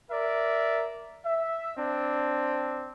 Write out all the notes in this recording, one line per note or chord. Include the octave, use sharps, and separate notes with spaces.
A#4 D5 E5
E5
C4 D4